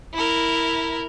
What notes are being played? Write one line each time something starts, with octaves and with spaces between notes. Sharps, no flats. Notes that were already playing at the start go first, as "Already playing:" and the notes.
E4 A#4